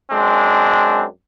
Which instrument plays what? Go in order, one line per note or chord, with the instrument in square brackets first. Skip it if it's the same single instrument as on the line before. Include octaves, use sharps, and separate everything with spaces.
[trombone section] F#2 G#3 C4 D4